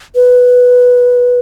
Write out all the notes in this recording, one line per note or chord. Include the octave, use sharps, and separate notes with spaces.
B4